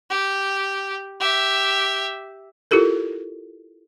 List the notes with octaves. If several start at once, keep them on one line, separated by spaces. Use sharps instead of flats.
G4
G4 E5
E4 F4 G4 A4 A#4